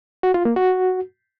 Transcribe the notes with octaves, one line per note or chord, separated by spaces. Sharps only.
F#4
F4
A#3
F#4